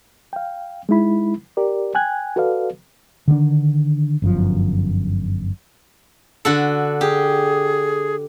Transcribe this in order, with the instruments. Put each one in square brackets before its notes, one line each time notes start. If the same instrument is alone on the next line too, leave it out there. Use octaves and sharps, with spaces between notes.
[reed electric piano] F5 G5
G#3 D#4 E4 B5
G4 A#4 D5
G5 G#5 F#6 G#6
F#4 A4 B4 D5 F5
[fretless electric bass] D3 D#3 A3 D4
G1 F#2 F3
[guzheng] D3 F#4 A4
[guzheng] G4 [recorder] G#4